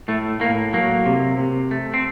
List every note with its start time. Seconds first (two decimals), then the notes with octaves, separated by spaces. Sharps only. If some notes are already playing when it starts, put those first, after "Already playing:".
0.08 A2 A3
0.40 A2 A#3
0.73 F#3 A#3
1.05 C3
1.38 C3
1.71 A3
1.94 C4